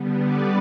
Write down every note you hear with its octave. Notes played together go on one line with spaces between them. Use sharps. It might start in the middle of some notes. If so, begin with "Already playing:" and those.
Already playing: D3 G3 B3
B4 D5